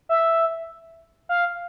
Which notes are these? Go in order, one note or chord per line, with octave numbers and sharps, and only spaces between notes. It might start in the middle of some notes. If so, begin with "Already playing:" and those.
E5
F5